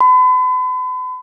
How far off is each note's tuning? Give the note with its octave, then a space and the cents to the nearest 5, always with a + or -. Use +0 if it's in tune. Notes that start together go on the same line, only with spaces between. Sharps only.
B5 +40